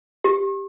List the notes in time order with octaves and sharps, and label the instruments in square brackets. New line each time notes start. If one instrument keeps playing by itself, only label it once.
[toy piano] G4